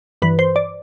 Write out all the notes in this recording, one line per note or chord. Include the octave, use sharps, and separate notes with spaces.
G2 E3 B4
C5
D5